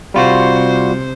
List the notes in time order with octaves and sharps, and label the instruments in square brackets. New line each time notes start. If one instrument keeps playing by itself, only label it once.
[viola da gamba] C3 C5 [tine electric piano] G3 F4 F#4